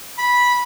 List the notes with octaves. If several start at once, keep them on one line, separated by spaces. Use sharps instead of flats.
B5